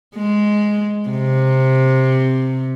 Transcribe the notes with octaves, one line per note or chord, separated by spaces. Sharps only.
G#3
C3